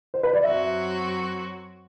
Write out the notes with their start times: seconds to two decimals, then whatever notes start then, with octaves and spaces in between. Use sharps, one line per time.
0.14 C5
0.23 B4
0.33 D5
0.44 F#2 F#3 C4 F#4 E5